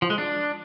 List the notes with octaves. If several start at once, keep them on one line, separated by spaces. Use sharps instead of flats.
F3
G#3
D4